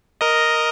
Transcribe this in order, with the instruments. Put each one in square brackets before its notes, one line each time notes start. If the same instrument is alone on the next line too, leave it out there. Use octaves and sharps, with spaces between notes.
[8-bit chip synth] A#4 D#5